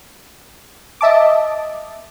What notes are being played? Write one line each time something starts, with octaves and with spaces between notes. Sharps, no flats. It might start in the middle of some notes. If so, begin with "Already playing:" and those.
D#5 E5 A5 D6